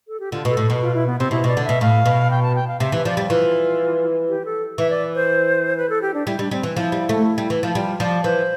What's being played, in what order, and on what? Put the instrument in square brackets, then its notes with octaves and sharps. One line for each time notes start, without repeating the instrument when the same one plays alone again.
[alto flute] A4
G4
[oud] D3 [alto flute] F4
[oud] B2
[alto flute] A4
[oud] A2
B2
[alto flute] F4
E4
B3
[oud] C3 [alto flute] C4
[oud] B2 [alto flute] E4
[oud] B2
[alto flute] D5
[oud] D3
[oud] B2 [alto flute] E5
[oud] A2 [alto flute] F5
[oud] B2
[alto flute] G5
A5
G5
F5
[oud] C3 [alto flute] E5
[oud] E3
[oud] F3 [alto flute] D5
[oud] G3
[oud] E3 [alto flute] F4
[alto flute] G4
A4
[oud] E3 [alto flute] E5
[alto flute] D5
C5
B4
A4
G4
D4
[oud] G3 [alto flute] E4
[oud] G3 [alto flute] D4
[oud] G3 [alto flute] C4
[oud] E3
[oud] F3 [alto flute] E4
[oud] G3
A3
G3
E3
F3
[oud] G3 [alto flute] F4
[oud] F3 [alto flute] D5
[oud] E3 [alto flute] C5